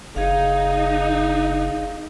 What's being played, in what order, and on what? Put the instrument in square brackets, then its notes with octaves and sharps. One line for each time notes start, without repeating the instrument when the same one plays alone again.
[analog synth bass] F#1 [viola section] D#4 [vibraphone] G#4 F5